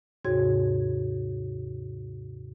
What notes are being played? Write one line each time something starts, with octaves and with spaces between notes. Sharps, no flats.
D#2 G#2 C3 F#4 C#5 G#6